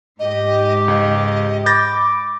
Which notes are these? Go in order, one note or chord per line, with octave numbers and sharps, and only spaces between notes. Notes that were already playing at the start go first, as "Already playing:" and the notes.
G#2 G4 D#5
C#2 D#5
B5 D6 G6 A6 A#6